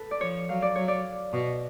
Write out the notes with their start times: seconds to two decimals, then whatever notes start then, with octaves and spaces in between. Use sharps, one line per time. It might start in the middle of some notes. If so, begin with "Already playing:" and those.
Already playing: A4 B4
0.11 D5
0.21 F3 C#5
0.49 F#3 F5
0.62 D5
0.75 F#3 C#5
0.88 D5
1.33 B2